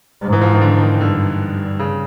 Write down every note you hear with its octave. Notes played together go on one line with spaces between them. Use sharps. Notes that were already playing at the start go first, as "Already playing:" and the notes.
G#2
E3
F3
D#3
D3
D#3
D#3
G2 D3
C#3